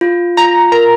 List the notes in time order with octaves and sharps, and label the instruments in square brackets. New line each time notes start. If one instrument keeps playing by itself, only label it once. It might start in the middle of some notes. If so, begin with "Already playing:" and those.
[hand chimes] F4
[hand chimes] F4 [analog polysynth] A#5
[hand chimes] A#4 [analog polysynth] A#5